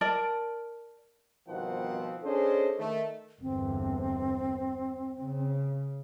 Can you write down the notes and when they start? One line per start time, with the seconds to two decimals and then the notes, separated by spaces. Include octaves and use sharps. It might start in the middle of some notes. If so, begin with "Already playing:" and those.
0.01 A#4 D5 A5
1.48 G1 B2 D#3 F3 C4 F#5
2.23 C#4 D4 G#4 A4 C5 D#5
2.79 D#3 A3
3.42 G1 E2 C4
5.19 C#3